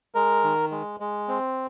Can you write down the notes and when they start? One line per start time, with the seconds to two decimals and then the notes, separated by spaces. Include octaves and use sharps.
0.15 G#3 A#4
0.44 D#3
0.71 G#3
1.00 G#3
1.28 C4